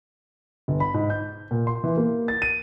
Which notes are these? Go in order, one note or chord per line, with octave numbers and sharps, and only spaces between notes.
G1
B5
G#2
G6
A#2
C6
E3
A#3
A6
D#7